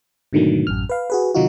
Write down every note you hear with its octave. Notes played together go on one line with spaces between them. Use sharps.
G#2 B2 D3 D#3 F#3 A3
A1 F#2 F6
B4 F5
F#4 G#4 B4
C3 D#3 F#3 D#4 F4 F#4